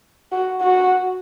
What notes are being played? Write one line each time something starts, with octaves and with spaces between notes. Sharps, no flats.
F#4
F#4